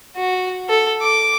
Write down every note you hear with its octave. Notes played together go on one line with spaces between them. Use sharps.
F#4
A4
D6